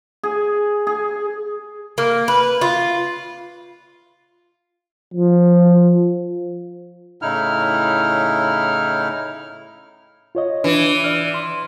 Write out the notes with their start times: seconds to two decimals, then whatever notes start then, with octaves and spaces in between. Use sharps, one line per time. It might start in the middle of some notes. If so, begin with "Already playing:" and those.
0.23 G#4
0.87 G#4
1.98 A#3
2.28 B4
2.61 F4
5.14 F3
7.22 A2 C#3 D#4 E4 F6
10.35 F4 C#5 D#5
10.64 E3 D4
11.04 D5 F6
11.34 C6